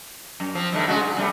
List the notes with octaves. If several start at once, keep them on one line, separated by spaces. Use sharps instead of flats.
F#2
F3 C4
G2 D#3 A3
C#3 G#3 F#4
G2
C3 G3 A3